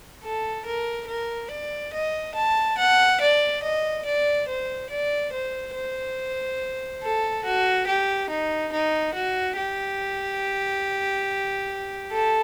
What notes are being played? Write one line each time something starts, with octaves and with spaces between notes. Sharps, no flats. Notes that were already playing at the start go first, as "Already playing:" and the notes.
A4
A#4
A#4
D5
D#5
A5
F#5
D5
D#5
D5
C5
D5
C5
C5
A4
F#4
G4
D#4
D#4
F#4
G4
A4